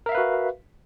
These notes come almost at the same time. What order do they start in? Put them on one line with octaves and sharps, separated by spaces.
A#4 E5 F5 B4 F#4